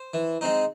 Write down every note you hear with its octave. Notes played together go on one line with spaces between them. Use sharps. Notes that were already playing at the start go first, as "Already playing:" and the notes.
Already playing: C5
E3
G#3 C4 D#4